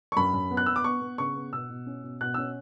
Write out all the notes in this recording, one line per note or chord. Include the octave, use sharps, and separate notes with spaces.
C#6
F#2 B5
F#2
B3
F#6
B3 E6
D6
B3 C#6
B3
C#3 C#6
B3
B2 E6
B2
C#4
B2
B2 F#6
C#4 E6